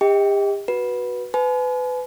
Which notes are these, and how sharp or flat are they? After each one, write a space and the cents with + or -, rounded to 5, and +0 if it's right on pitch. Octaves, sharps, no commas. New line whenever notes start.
G4 +40 D#5 +30 G5 +0
F#4 +0 B4 -10
B4 +25 G#5 +40